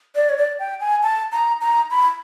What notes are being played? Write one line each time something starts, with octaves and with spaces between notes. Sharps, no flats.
D5
C#5
D5
G5
G#5
A5
A#5
A#5
B5